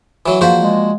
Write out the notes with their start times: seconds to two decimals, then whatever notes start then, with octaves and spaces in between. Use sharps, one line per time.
0.26 E3 F#3
0.41 F3 A#3 F#4 G#4 C5 D5 F5 F#5
0.60 G#3